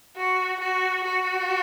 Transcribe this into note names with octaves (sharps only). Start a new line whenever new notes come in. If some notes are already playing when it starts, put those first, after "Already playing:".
F#4
F#4
F#4